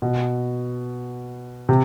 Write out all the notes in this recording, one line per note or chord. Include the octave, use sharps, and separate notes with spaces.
B2
C3